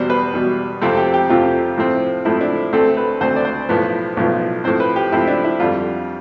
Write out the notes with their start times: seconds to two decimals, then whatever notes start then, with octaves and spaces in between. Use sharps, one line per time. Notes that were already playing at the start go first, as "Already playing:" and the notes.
Already playing: E2 B2 G3 C5
0.10 B4
0.34 E2 B2 G3
0.82 F2 C3 F3 A3 C4 A4
0.97 G4
1.14 G4
1.30 F2 C3 F3 A3 C4 F4
1.78 A2 F3 A3 C4
2.25 A2 F3 A3 C4 E4
2.41 D4
2.73 D2 D3 A3 C4 A4
2.97 B4
3.20 D2 D3 A3 C4 C5
3.36 D5
3.45 C5
3.69 B1 A2 F3 B3
4.17 B1 A2 F3 B3
4.64 A2 F3 C4 C5
4.80 B4
4.96 G4
5.12 A2 F3 C4 E4
5.28 D4
5.44 E4
5.60 F2 D3 G3 F4